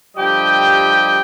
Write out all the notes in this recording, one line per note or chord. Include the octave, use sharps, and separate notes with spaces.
D3 F3 G3 G4 D#5 G5